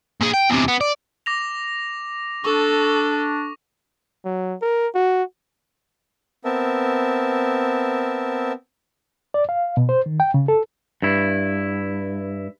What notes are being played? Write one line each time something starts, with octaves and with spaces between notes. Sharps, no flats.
A#2 G#4
G5
E2 C3
B3
D5
D6 A#6 F7
D4 A4 C#6
F#3
A#4
F#4
B3 C4 A#4 E5 A5
D5
F5
B2
C5
D#3
G5
C#3
A4
G2 E4